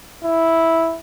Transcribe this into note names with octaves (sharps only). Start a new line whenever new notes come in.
E4